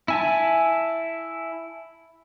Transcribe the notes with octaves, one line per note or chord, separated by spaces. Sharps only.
E4 G#5 A5